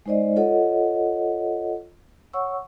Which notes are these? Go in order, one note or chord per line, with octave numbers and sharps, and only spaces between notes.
G#3 D#4 C5 D5 D#5
F4 A4 C#5 D#5 F#5
C#5 F#5 C#6 E6